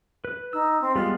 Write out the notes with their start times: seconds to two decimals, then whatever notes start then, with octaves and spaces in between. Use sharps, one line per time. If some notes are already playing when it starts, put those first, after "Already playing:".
0.25 B4
0.53 D#4 E6
0.81 C4
0.95 G3 G#3 B3 F4